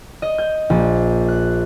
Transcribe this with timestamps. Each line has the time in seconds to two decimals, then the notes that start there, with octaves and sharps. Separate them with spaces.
0.22 D#5
0.38 G6
0.70 A#1
1.28 F#6